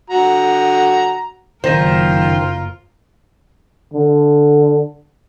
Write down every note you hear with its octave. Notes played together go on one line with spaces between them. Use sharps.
D3 F#4 A#5
F#1 D#3 F4 A#4 C5 A#6 D#7
D3